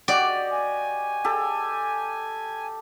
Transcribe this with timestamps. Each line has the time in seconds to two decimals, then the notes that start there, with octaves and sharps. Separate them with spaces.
0.08 F#4 G4 D5 D#5
0.52 G#5
1.25 G4 A4